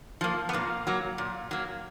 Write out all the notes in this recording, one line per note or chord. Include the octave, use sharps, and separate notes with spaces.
F3 A#3
B3
A#2 A#3
F#3 A#3
A#2
F#3 A#3